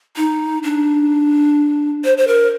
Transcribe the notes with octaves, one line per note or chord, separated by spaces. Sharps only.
D#4
D4
C5
C5
A#4